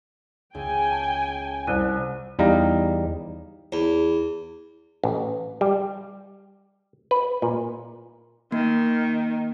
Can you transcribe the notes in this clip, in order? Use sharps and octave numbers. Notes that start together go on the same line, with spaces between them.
C#2 G5 G#5
A5
C2 C5 F#6 D#7
E2 G3 D#4 F5 A#5
E2
A1
G3
B4
A#2
D#3 A#3